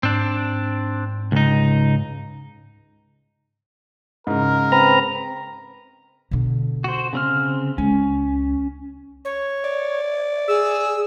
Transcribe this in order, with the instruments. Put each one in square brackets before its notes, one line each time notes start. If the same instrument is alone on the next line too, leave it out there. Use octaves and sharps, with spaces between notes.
[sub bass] G#2 [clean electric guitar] C4 D4
[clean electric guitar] C#2 D#4
[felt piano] G#2 C#3 [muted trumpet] A#4
[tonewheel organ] C4 B4 A#5
[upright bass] B2 D3
[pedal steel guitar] F#4 C5
C#3 C4 F6
[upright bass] C#2 [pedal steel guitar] C#4
[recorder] C#5
[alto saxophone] D5
[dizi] G#4 [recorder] E6